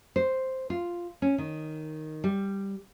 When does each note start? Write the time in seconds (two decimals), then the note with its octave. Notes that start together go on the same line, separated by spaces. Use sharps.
0.16 C5
0.70 F4
1.22 C#4
1.38 D#3
2.24 G3